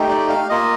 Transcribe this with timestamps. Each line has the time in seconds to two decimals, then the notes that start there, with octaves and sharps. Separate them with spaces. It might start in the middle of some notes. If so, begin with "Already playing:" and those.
Already playing: A3 D#4 G4
0.09 D5
0.29 F5
0.49 A#3 F4 D#5